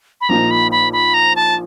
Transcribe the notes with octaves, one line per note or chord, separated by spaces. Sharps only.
B5
A#1 A#2 F3 A#3 D#4 A#5
B5
B5
B5
A#5
A5